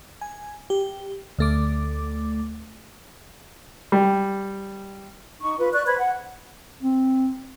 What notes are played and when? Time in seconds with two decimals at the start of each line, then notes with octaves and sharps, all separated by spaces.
0.21 G#5
0.70 G4
1.39 D2 A3 D6
3.92 G3
5.41 D#4 C#6
5.59 F4 B4
5.73 D5 C#6 F#6
5.86 B4 C5 B5 G#6
5.99 F#5
6.82 C4